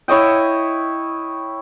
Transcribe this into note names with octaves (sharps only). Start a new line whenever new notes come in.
E4 C#5 D#5 G5